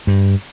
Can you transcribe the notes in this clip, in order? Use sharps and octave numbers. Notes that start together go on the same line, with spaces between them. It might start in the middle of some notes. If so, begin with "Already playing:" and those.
G2